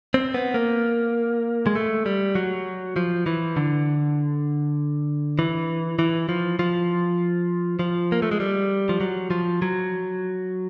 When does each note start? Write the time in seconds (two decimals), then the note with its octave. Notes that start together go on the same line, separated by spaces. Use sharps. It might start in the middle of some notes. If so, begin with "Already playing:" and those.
0.14 C4
0.34 B3
0.54 A#3
1.67 G#3
1.76 A3
2.06 G3
2.35 F#3
2.96 F3
3.26 E3
3.56 D3
5.39 E3
5.99 E3
6.29 F3
6.59 F3
7.79 F3
8.12 A#3
8.22 A3
8.31 G#3
8.40 G3
8.89 F3
9.01 F#3
9.31 F3
9.62 F#3